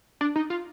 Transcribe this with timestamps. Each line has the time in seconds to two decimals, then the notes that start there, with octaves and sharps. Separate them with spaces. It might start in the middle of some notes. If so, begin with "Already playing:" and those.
0.21 D4
0.36 D#4
0.50 F4